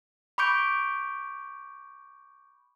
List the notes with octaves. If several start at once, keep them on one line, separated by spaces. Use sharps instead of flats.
B5 C#6 D6 G6 D7